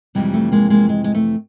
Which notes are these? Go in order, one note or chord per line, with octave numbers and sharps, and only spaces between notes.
F2 C3 E3 G3 G#3
A3
G#3 A#3
G#3 A#3
G#3
G#3
A3